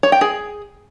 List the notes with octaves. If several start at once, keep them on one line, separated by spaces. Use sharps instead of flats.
C#5
G5
G#4